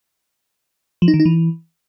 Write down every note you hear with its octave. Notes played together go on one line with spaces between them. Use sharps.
F3
D#4
D#3
D#4
E3